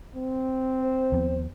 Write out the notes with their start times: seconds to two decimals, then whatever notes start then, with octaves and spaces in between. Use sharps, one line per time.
0.15 C4
0.80 C5
1.12 D#2 F3 B3